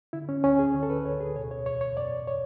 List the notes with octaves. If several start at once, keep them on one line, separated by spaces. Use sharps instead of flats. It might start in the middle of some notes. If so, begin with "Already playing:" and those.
D3 E4
C#4
D2 C#4
G#4
D3
A4
B4
D2 C#5
G#4
B2 C#5
C#5
E2 C#5
C#5
F#2 D5
C#5